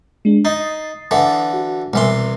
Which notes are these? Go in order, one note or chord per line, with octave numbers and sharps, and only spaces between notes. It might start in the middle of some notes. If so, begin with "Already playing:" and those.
G#3 D4
D#4 D#6 A6 C7
D3 E3
F#4
C2 B2 E3 C6